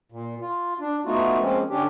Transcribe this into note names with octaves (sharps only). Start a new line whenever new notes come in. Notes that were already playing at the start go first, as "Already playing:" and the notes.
A#2
F4
D4
A3 B3 D#4 F4 F#4
F3 G#3 A#3 C4 C#4
D3 C#4 D4 G4